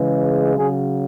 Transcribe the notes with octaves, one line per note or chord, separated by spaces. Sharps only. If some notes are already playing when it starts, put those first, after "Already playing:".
Already playing: C#3 E3 G#3
C#3 F#3 G#4